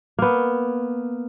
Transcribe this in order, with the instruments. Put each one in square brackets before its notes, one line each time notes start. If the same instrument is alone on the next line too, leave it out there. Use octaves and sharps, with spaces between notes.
[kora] A#3 B3